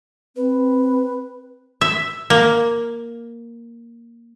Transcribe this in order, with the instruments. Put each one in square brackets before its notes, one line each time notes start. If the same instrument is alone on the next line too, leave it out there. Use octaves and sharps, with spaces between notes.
[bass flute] C4 [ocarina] B4
[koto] E5
A#3